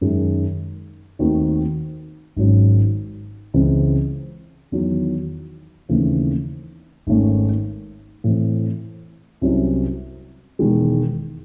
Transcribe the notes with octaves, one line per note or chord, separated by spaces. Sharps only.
F#2 D#3 G#3
D#2 D#3 A3 C4 F#4
G#1 G#2 F#3 C#4
C#2 C#3 E3 C4
E2 D#3 F#3
D#2 C#3 E3 A3 C4
G#1 G#2 D#3 A3 C#4
A2 E3 C4
C2 C3 F#3 C#4 E4
E1 E2 D#3 G#3